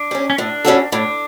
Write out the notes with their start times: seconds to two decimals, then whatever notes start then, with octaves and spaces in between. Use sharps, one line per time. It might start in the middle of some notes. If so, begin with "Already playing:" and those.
Already playing: D4
0.11 G3 C#4
0.30 C#4
0.38 A2 D4
0.65 G3 C#4 F#4 A4
0.92 A2 D4